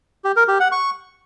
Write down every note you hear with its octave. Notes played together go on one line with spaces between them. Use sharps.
G4
A#4
G4
F#5
C#6